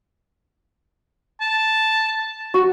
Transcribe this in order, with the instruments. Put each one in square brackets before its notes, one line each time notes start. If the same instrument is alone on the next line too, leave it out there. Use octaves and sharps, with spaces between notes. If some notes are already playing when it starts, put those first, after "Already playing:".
[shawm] A5
[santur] F#4